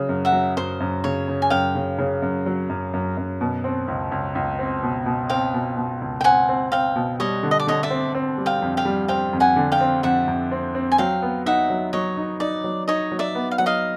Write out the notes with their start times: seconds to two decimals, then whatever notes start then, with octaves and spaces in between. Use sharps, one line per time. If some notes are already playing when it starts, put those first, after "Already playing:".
Already playing: C#3 F#3
0.09 F#2
0.25 E5 F#5
0.32 F#3
0.57 F#2 C5
0.80 F#2
1.04 C#3 C#5
1.28 C#3
1.42 G#5
1.50 F#2 F5 G5
1.75 C#3
1.98 C#3
2.22 F#2
2.46 F#3
2.70 F#2
2.93 F#2
3.17 F#2
3.41 B2
3.64 C4
3.88 C#2
4.12 C#2
4.35 C#2
4.59 C4
4.83 B2
5.06 B2
5.30 C4 F5 G5
5.54 B2
5.77 B2
6.02 C#2
6.21 G5
6.24 C4 F#5 G#5
6.49 C4
6.72 C4 F5 G5
6.96 B2
7.20 G3 C#5 D#5
7.43 D3
7.51 D#5
7.59 D5
7.67 D3 C#5 D#5
7.83 D5 E5
7.90 C4
8.15 C4
8.38 G3
8.46 F5 G5
8.62 F2
8.77 F5 G5
8.85 G3
9.08 C4 F5 G5
9.33 F2
9.40 F#5 G#5
9.56 D3
9.72 F5 G5
9.81 C4
10.03 F2 E5 F#5
10.28 F2
10.52 C4
10.75 C4
10.92 G#5
10.98 F#3 F5 G5
11.22 B3
11.46 D#4 E5 F#5
11.70 F#3
11.93 F#3 C#5 D#5
12.17 D#4
12.40 D#4 D5
12.64 F#3
12.88 D#4 C#5 D#5
13.12 F#3
13.19 D5 E5
13.35 B3
13.51 F5
13.58 F#3 F#5
13.66 D#5 F5